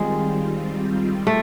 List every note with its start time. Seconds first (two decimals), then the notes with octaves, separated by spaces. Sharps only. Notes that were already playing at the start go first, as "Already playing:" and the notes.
Already playing: D#3 G3 G#3 C4 F4
1.27 A3